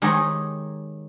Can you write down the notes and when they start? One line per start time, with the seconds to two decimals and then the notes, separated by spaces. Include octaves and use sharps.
0.02 D#3 G#3 D#4 G4 G#4 C#5